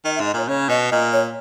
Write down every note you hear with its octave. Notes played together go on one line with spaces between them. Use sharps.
D#3 D#5
E5
G#2
D#5
A#2 C#5
C#3 C#5
B2 D#5
A#2 D#5
C#5